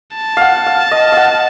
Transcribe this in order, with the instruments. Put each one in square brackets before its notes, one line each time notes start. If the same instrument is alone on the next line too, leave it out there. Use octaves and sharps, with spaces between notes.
[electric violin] A5
[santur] F5 F#5
F5
D#5
F5 F#5